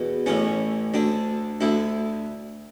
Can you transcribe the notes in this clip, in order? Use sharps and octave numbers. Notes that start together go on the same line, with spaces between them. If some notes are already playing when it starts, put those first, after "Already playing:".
Already playing: E2 B2
A1 A2 E3 C#4
D2 D3 D4
D2 D3 E4